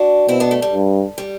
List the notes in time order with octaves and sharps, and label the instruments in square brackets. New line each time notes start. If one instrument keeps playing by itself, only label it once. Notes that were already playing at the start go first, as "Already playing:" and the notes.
Already playing: [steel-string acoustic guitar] D4 F#4
[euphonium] B2 [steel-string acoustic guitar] C4 E4
[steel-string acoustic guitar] B3 D4
A3
G3
[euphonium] G2
[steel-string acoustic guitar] G3